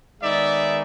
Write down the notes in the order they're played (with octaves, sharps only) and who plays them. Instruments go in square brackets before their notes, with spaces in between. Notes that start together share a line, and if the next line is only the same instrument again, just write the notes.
[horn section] D#3 G#3 B3 D#4 D5 E5